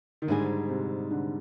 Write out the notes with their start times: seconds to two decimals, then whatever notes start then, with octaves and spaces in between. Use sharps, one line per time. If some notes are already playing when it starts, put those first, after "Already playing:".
0.22 D#3
0.27 G#2 D3 G3 C4 D#4 G#4
0.69 C3
1.11 D3